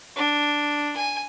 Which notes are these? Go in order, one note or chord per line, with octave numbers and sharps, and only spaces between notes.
D4
G#5